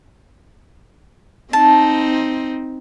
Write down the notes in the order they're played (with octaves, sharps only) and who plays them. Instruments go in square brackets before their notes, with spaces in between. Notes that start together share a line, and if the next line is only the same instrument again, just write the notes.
[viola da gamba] C4 D#4 [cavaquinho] A5